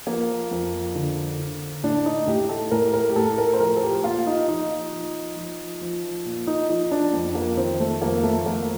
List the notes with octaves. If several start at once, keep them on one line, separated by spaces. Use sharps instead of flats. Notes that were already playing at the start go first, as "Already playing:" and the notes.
F3 A#3
F2
D3
D3
A2 D4
D#4
A2 G4
A4
A2 A#4
A#4
G4
A2 A4
A#4
C5
F3 A#4
A4
G4
A#2 F4
D#4
F3 D#4
F3
F3
F3
A#2
D#4
F3 D#4
D4
F2
A#3
D#3 C4
A3
F2 A#3
A3
F2 A#3